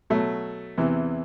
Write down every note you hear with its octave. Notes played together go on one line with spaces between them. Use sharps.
B2 F#3 A3
E2 C3 E3